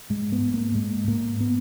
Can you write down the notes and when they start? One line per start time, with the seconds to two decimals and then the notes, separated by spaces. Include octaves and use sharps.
0.10 G#2 G#3
0.32 B3
0.42 G#2
0.54 A#3
0.75 G#2 G#3
1.07 G#2 A#3
1.41 B3